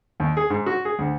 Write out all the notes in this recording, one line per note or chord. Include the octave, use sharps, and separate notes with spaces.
D#2
G#4
G#2
F#4
G#4
D2